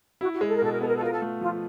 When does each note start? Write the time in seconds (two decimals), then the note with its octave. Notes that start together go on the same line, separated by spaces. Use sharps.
0.21 E4 F#4
0.35 F#4
0.41 G#3
0.48 A4
0.56 A#4
0.62 B2 A4
0.72 A#4
0.80 B3 A4
0.87 A#4
0.96 A4
1.01 F4 A#4
1.11 A4
1.21 A3
1.41 F3 F4